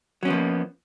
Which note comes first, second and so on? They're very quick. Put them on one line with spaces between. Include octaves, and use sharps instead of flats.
F#3 C#4 B3 F3 A#3